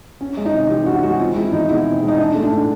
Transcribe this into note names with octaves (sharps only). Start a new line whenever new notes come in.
C#4
G#3
D#4
C3
E3 G4
C#4 F#4
G#3 F#4
C4 F4
G#3 E4
E2 D#4
B2 E4
C4
G#3
D#4
D4
A3
D4
A2